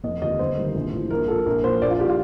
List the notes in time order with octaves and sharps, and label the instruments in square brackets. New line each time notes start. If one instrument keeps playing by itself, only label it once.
[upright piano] F1 D#5
D#2 D3 F3 D#5
G1 C5
G2 D#3
A#1
A2 F3
A#1 A#4
A#2 F3 A4
A#1 A#4
A#2 F3 C5
A#1 D5
F4
F3 G4
A#2
F4